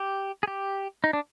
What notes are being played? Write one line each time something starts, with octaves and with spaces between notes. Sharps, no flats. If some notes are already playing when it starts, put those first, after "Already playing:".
Already playing: G4
G#4
G4
D#4
D4